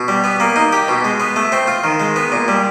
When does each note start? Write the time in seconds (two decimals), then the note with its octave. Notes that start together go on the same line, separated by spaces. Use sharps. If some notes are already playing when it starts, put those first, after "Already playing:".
Already playing: B2
0.08 G3
0.24 B3
0.40 A#3
0.56 D#4
0.73 G4
0.88 B2
1.04 G#3
1.20 B3
1.36 A3
1.52 C4
1.67 F4
1.84 D#3
2.00 G#3
2.16 B3
2.32 A#2
2.48 G3